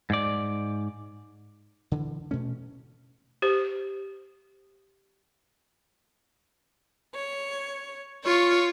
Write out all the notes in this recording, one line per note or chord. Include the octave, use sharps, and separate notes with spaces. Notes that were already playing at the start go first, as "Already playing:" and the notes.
G#2 D5
D3 E3
B2 A3 C#4
G4 C5
C#5
F4 C#5 C#6